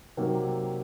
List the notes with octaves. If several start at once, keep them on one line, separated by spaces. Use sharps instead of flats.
C3 D#3 F#3 A#3